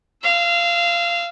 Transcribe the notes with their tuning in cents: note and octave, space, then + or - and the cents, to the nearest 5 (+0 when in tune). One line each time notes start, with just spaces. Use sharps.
F5 -20 E6 -10